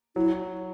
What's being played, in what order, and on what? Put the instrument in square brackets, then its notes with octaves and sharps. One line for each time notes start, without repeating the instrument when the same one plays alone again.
[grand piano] F#3 [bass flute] E4